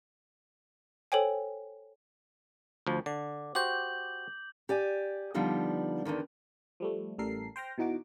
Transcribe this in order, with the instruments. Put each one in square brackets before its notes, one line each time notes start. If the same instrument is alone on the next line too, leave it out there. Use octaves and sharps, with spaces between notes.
[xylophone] A4 C5 C#5 G5 G#5
[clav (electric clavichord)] D2 F3
[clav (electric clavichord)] D3 [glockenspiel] D6
[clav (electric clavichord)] F#4 G4 C5 [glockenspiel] G6 F#7
[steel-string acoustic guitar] G4 D5 G#5
D3 F3 G3 B3 D#4
E2 G#2 D3 D#3
[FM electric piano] F3 G3 A3
A1 G3 A4 A#4 C7
C5 G5 F6 A#6
B2 E3 D#4 F#4 D6